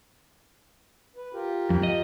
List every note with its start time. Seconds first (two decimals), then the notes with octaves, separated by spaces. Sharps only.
1.16 B4
1.33 F4 G4 A#4
1.70 F2
1.83 D#5